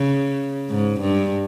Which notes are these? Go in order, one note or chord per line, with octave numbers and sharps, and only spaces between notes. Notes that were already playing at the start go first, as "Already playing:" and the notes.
Already playing: C#3
G#2
G2